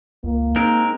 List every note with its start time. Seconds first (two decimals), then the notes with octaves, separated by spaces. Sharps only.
0.24 C#2 A#3
0.56 G#3 C4 D#4 A#4